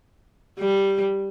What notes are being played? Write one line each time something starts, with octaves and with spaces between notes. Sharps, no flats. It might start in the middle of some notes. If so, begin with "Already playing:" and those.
G3